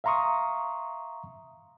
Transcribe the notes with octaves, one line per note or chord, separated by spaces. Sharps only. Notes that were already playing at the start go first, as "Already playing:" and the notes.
E5 F5 A#5 C6 C#6 D#6